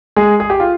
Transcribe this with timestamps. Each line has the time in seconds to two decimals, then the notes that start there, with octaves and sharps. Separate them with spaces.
0.16 G#3 G#4
0.40 G#4
0.50 G4
0.60 F4